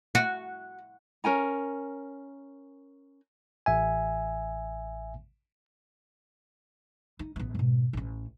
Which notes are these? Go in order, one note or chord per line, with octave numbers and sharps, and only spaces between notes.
F#4
C#4 A#4 G#5 A#5
A1 E5 G#5
D#4
A1 B3
G#2 B2
A1 C#4